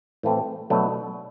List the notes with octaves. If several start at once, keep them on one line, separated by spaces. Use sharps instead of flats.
A2 E3 A3 C4
B2 F#3 A3 D4